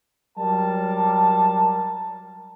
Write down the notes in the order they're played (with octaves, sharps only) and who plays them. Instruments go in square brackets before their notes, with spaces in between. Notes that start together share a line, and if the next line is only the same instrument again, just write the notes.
[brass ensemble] F#3 G3 A#4 A5